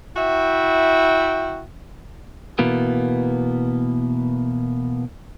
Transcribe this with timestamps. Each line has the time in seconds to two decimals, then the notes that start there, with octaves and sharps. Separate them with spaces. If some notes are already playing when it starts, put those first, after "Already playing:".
0.16 E4 F#4 E5 G5
2.59 B2 E3 A#3 B3